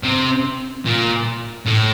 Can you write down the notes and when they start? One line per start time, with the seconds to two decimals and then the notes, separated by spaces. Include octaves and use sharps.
0.03 C3
0.85 A#2
1.66 A2